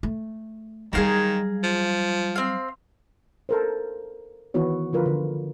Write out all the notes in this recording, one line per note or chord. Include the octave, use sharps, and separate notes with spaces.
A3
D#3 F#3 G3 G#4 F5 A#5
F3
C4 F5
A4 A#4 C5
D#3 E3 B3 E4 F#4 C#5
D3 F3 F4 A#4 B4
D3